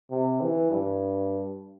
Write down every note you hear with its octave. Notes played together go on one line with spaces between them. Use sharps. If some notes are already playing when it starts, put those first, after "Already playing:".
C3
E3
G2